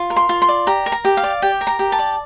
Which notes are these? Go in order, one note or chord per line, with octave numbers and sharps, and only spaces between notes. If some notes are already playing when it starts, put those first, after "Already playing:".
Already playing: F4
A#4
C6
F4
C6
D5
G4 A#5
A#4
A#5
G4
F5
D5
G4 G5
A#4
A#5
G4
A5
D5